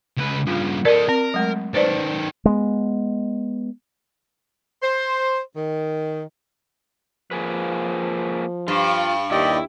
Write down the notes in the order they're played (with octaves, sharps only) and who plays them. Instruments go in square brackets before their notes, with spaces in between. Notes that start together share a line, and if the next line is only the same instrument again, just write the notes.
[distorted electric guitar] C#2 B4
[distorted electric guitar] G2 C#3 [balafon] F4
[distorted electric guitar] A4 D#5 [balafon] A#4 D5
[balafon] C4 [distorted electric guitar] A#4
[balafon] F#3 G#3 A3
[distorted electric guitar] D#3 A4 [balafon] B4 C5 D5
[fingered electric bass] G#3 B3
[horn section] C5
D#3
[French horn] F3 [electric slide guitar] A#3 G#4 B4
[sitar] G2 [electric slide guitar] F4
[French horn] D#2 [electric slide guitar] E4 [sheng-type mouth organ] G4 D5 D#5